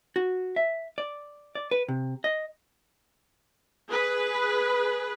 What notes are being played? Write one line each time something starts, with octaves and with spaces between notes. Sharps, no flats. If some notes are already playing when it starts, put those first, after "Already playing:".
F#4
E5
D5
D5
B4
C3
D#5
G#4 B4